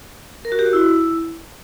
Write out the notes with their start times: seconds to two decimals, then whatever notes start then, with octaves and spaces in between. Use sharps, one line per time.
0.45 A#4
0.52 F#4
0.59 G4
0.66 F#4
0.73 E4